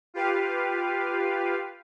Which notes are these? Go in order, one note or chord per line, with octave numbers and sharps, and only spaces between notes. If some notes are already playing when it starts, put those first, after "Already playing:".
F4 G4 B4 F5